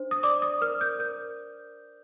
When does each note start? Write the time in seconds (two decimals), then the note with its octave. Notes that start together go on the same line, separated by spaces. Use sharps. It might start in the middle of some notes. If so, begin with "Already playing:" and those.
Already playing: D4 C5
0.11 D#6
0.23 D5 D6
0.42 D#6
0.61 A#4 F6
0.81 G6
0.99 A#4 G6